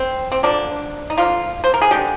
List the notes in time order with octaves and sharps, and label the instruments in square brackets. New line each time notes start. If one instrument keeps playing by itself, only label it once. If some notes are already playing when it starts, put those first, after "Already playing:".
Already playing: [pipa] C4
C4
D3 F3 A#3 D4
D#4
D3 F3 A#3 F4
C5
A#4
G#4
D3 G#3 G4